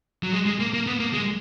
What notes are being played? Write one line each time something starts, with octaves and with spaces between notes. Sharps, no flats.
F#3
G#3
G#3
A#3
A#3
B3
A#3
G#3